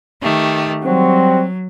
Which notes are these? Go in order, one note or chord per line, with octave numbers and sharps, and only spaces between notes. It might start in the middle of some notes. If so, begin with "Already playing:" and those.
D#3 A3 G4
F#3 G3 C4 F#4